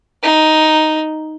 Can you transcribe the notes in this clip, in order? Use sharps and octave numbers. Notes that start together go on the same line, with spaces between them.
D#4